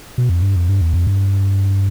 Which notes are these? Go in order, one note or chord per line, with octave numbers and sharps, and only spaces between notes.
B2
F2
G2
F2
G2
E2
F2
G2